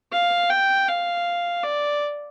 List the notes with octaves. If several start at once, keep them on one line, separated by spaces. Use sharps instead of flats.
F5
G5
F5
D5